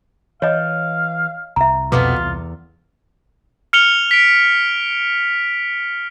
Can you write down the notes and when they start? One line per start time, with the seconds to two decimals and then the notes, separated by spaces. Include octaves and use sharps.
0.42 E3 C#5 D#5 F5
1.56 C2 E5 A#5
1.92 F2 B2 B3 F4 D6
2.16 E2
3.73 F6 C#7 F7 G7
4.11 B6 D7